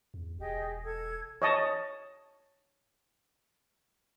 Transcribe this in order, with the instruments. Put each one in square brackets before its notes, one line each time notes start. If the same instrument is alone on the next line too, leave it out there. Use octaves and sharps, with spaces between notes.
[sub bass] E2
[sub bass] E1 [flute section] G4 G#4 D#5
[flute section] A4 G#6
[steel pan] C#5 D#5 A5